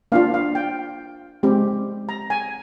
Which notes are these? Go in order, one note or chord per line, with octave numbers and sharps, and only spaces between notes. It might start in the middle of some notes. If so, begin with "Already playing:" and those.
A#3 D4 F4 F5
F5
G5
G#3 C4 G4
A#5
G#5